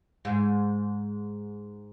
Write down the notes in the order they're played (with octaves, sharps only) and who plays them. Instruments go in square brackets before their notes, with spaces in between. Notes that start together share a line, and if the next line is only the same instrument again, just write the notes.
[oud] G#2